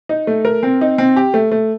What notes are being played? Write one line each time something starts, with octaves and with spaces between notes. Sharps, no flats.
D#4
A3
A#4
C4
D#4
C4
G4
A3
A3